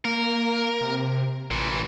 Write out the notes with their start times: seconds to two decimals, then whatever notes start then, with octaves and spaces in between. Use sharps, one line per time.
0.05 A#3 A#4
0.81 C3
1.51 A1 A#2 E3